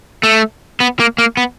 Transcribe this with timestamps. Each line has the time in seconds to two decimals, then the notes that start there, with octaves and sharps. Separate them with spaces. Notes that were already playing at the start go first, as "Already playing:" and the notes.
0.23 A3
0.80 B3
1.00 A#3
1.18 A#3
1.37 B3